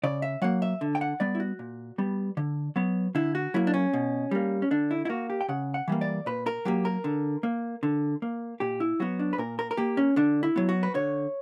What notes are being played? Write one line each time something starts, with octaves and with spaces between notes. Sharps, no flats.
C#3 D5
E5
F#3 A#3 F#5
E5
D3
G5
F#5
G3 B3 D5
E4
F#4
A#2
G3 B3
D3
F#3 B3
D3 E4
F#4
F#3 A#3 E4
D4
C#4
B2
G3 A#3
C#4
D3 D4
E4
E4
A#3 F#4
G4
G5
C#3 F#5
F#5
E3 G3 A#3
D5
A#2 B4
A#4
F#3 A#3 G4
A#4
D3
A#3
D3
A#3
A#2 G4
E4
F#3 B3 F#4
D4
B4
A#2 A#4
A#4
A#4
A#3 G4
C#4
D3 D4
E4
F#3 B3
F#4
B4
D3 C#5